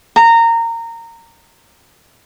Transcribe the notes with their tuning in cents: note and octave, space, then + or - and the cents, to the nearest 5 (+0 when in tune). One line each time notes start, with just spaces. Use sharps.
A#5 -20